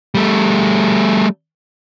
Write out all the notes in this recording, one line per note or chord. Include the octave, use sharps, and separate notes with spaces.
G3 A3